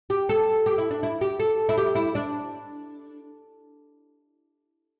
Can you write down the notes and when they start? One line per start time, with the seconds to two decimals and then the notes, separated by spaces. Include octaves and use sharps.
0.10 G4
0.29 A4
0.66 G4
0.78 E4
0.91 D4
1.03 E4
1.21 G4
1.39 A4
1.69 E4
1.78 G4
1.95 E4
2.15 D4